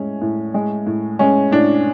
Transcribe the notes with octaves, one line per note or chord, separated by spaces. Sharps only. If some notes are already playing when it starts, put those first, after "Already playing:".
Already playing: A2 G#3 C#4
A2
G#3
A2
G#3 C#4
A2 D4